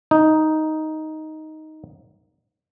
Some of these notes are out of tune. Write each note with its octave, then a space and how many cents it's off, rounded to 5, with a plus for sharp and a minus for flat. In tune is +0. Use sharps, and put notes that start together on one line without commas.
D#4 +5